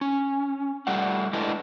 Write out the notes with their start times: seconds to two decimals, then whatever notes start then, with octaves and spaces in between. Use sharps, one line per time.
0.01 C#4
0.87 G3 A3 D5 F#5
1.33 G#3 A3 D4 E4 B4 D#5